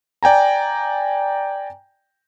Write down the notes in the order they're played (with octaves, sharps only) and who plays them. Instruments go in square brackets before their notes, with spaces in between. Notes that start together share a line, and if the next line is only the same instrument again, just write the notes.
[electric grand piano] D5 G5 G#5 A#5